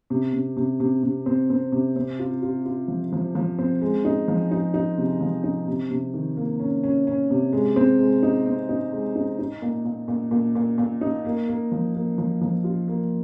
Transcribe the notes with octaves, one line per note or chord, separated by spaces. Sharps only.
C3
C3
C3
C3
C3
C4
C4
C3
C4
F4
F4
F4
F3
F3
F3
C4
G#3
D#4
F3
D#4
D#4
C3
F3
D#4
C3
C3
D#3
A#3
C#4
C#4
C#4
C3
G#3
C4
G#3
D#4
C4
D#4
G#3
D#4
D#4
A#2
A#2
A#2
A#2
A#2
A#2
D#4
A#3
A#3
F3
A#3
F3
F3
F4
A#3